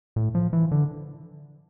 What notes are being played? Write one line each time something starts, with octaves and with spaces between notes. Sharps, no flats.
A2
F3
E3
D3